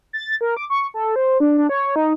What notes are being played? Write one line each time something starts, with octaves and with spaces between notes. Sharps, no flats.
A6
A#4
D6
C#6
A4
C5
D4
D4
C#5
D#4